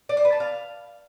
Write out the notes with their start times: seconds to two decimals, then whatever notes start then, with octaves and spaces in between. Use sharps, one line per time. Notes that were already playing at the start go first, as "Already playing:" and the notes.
0.09 D5
0.17 C5
0.25 B4
0.32 A5
0.40 F5